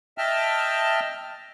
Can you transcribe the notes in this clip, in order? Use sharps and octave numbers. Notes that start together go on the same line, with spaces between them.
D#5 E5 G5 A5 F6